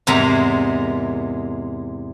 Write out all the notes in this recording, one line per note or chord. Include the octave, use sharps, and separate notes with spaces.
E2 G#2 C3 G#3 A#4 A#5